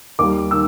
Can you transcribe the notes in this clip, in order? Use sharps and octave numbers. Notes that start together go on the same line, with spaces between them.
D#2 D#3 G3 D6
D#3 E6